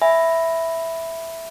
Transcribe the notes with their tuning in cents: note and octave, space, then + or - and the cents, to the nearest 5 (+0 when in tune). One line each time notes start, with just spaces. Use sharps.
E5 +0 G#5 -10 B5 +0